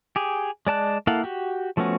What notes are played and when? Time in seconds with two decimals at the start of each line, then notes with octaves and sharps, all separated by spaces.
0.16 G4 G#4
0.67 G#3 D5 A5 F#6
1.07 A#3 E4 A4 F5 F#5
1.24 F#4 G4
1.77 F3 A3 B3 C#4 F#4